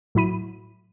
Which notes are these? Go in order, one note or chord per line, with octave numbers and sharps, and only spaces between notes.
A2 F#3 E4 B5 D#7